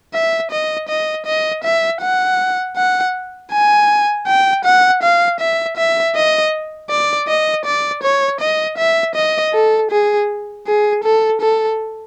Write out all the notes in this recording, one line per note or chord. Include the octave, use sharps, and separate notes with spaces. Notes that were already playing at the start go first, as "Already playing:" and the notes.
E5
D#5
D#5
D#5
E5
F#5
F#5
G#5
G5
F#5
F5
E5
E5
D#5
D5
D#5
D5
C#5
D#5
E5
D#5
A4
G#4
G#4
A4
A4